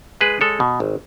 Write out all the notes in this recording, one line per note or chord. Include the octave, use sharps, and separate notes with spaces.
G#3 G#4 B4
G#3 A4 C#5
B2
G#1